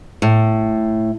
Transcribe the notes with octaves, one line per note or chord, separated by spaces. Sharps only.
A2